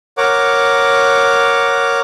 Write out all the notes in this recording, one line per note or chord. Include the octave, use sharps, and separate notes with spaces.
A#4 C#5 F#5 D6